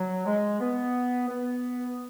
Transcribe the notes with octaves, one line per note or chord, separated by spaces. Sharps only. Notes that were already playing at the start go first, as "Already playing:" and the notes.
Already playing: F#3
G#3
B3
B3